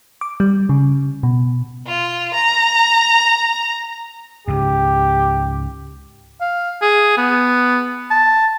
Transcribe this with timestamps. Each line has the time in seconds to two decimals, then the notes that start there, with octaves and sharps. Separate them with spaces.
0.21 D6
0.40 G3
0.69 C#3
1.23 B2
1.87 F4
2.35 A#5
4.48 C#2 G#2 G4
6.41 F5
6.82 G#4
7.17 B3
8.11 A5